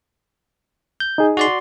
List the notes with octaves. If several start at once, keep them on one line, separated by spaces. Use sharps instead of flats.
G6
D#4 G#4
F#4 D5 C6